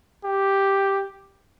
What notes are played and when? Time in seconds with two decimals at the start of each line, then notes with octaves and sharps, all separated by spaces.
0.24 G4